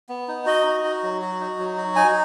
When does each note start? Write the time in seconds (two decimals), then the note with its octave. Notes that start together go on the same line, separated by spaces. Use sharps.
0.09 B3
0.28 D#4
0.46 F#4 D#5
0.66 D#4
0.84 F#4
1.03 F#3
1.21 F#4
1.40 D#4
1.59 F#3
1.77 F#4
1.96 D#4 G#5